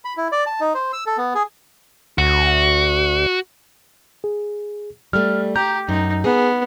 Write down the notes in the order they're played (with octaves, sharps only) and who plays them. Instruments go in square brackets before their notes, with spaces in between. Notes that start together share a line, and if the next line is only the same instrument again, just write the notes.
[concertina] B5
E4
D5
A5
D#4
C5
E6
A4
B3
G#4
[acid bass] D2 [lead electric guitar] F#4
[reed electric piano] G#4
[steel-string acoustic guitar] G3 A3 [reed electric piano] F6
[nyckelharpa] G4 [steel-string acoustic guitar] A#5 [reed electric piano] G6
[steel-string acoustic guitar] F#2 [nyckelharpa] D#4
[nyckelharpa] B3 [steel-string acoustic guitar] G#4